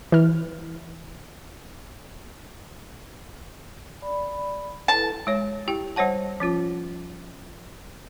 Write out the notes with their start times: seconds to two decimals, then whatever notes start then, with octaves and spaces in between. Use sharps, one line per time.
0.12 E3 F6
4.02 D5 B5
4.88 E4 A4 B4 A5
5.27 G#3 C#5
5.68 E4 G4 G5
5.96 G3 C5 C#5 F#5 A5
6.40 F3 C#4 F4